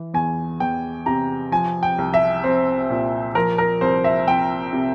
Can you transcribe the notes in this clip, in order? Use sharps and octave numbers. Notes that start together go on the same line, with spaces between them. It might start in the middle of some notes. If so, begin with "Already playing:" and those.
Already playing: E3
E2 G#5
E2 G5
C3 A#5
F3 G#5
G5
C2
E5
C4 C5
A#2
F3 A#4
A#4
C2 C5
E5
C4 G5
C3